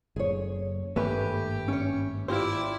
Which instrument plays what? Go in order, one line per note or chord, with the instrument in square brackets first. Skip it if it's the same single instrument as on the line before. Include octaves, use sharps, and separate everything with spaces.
[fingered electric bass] F#1 [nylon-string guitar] G#4 C#5
[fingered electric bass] G#1 G2 A#3 [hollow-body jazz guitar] A3 B4 [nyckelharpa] G4 [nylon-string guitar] E5 G#5
[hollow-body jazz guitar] C#4 C#5
[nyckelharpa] E4 D5 [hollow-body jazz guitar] F4 G4 C5